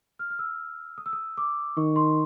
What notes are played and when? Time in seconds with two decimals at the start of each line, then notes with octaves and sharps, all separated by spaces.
0.19 F6
0.30 F6
0.39 E6
0.98 D#6
1.06 E6
1.13 D#6
1.37 D6
1.77 D#3 C#6
1.96 C6